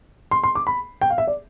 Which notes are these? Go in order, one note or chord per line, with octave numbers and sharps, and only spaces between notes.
C6
C6
D6
B5
G5
F5
E5
D5